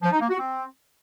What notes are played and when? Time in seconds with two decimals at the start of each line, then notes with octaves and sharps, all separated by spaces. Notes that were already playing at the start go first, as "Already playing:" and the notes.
0.02 F3
0.12 D#4
0.21 A#3
0.30 F#4
0.39 C4